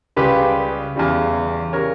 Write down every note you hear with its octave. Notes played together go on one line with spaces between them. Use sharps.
C#2 C#3 G3 G4 B4
E2 C#3 G3
C#3 G3 A#4 C#5